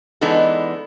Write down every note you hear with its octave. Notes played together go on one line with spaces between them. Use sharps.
E3 G#3 B3 D4 D#4 A4